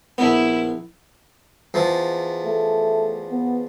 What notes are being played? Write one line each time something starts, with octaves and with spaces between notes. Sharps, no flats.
A#1 B3 E4
E2 F3
A3
B3